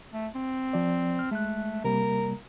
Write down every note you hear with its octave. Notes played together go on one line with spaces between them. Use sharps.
A3
C4
F3 D5
F6
G#3 A3 F#6
C3 G3 A#3 A#4